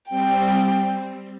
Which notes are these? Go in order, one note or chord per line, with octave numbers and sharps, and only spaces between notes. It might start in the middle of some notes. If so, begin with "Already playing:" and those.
G3 C4 G5